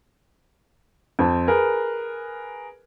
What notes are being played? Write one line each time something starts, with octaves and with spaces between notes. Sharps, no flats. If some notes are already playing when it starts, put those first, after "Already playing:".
F2 C4 A5
G#4 A#4 B4